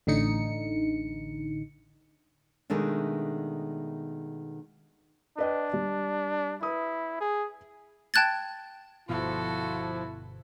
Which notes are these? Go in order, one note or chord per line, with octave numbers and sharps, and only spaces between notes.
A1 D3 D#4 C#7
B2 D#3 G#3 A3 D4
D4 B4 D#5 G5
G3
E4 B4 D#6
G#4
G5 A5 F#6 G#6 A6
G1 B2 F3 E4 F#4 A4